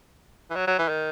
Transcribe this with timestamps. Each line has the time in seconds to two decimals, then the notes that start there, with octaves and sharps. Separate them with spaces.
0.51 E3
0.56 F#3
0.67 F#3
0.79 E3
0.89 D#3